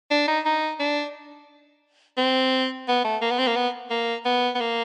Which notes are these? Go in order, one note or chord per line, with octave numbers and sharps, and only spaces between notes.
D4
D#4
D#4
D4
C4
B3
A3
A#3
B3
C4
A#3
B3
A#3
B3
B3
A#3